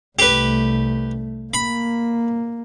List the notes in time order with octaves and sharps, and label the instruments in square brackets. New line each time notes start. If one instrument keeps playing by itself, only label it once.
[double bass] C2 A3 [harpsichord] G4 B4
[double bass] A#3 [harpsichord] B5